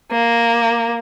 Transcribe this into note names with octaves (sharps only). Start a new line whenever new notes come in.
A#3